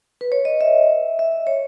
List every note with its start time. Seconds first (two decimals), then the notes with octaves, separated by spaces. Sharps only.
0.21 B4
0.32 C#5
0.45 D#5
0.61 E5
1.19 E5
1.32 D#5
1.47 C#5